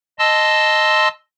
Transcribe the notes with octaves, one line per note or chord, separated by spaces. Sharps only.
D#5 A5 C6 E6